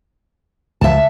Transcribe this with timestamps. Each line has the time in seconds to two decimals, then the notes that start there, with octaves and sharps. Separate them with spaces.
0.81 C#2 E5 A5